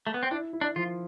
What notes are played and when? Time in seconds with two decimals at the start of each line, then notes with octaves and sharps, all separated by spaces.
0.07 A3
0.14 B3
0.23 C4
0.31 D4 E4
0.53 E4
0.61 D4
0.76 F3 F4